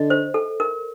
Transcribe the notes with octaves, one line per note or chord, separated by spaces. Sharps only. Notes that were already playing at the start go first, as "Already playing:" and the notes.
Already playing: D3 D#5
C5
A4
A#4